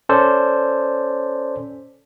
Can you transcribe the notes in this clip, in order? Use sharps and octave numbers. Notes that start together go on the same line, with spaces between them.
C#4 A4 C5 D5